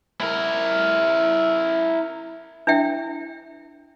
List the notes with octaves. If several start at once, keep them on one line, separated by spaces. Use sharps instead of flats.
E4 A#4
D4 E4 E5 G5